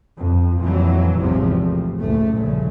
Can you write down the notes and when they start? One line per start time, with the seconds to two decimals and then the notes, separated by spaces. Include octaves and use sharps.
0.17 F2
0.60 F2 A#2 E3 F#3
1.17 G#1 E2 G#2 C3 F3
1.57 A2
1.99 F#1 C#2 A2 A3
2.31 A#1 G2 A#2 C#3